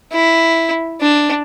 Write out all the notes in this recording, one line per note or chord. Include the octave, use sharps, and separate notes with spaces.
E4
D4